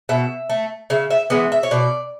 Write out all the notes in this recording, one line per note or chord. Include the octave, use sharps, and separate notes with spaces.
B2 E5
A3
C#3 E5
E5
E3 G#3 B3 E5
E5
C#5
B2 D5